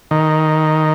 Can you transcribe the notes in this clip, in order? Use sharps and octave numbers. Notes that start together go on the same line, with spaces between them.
D#3